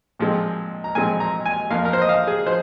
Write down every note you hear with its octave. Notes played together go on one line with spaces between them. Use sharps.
A#2 F3 G#3 C4
A#5
A#2 F3 G#3 C4 G#5
A#5
G#5
F2 F3 A#3 F5
A#4
C5
D#5
F5
G#4
F3 C5